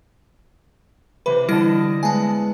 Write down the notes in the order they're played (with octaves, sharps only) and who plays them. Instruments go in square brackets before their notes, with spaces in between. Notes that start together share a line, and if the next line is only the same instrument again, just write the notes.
[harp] C3 E3 B5 [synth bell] B4
[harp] D3 D#5 A5 [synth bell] G3 E4 A#6
[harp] G#3 B3 E4 [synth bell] G#5 A5